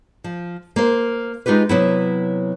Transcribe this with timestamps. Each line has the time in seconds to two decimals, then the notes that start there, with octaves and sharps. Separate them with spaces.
0.24 F3
0.76 A#3 C5
1.46 G#3 D#4 F4 G4 B4
1.69 C3 F#3 B3 E4